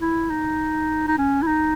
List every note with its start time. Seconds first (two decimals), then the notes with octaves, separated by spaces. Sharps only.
0.02 E4
0.30 D#4
1.08 D#4
1.18 C#4
1.42 E4
1.47 D#4